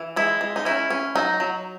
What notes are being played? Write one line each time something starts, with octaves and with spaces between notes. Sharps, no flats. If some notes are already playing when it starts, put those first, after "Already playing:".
Already playing: E3
G#3 E4
G#3
D#4
C#4 E4
C#4
F#3 D#4
F#3